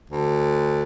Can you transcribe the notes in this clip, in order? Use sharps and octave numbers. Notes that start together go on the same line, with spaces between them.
D2